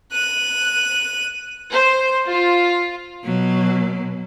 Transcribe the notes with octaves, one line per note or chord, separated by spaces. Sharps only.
F#6 D#7
C5
F4
B2 F#3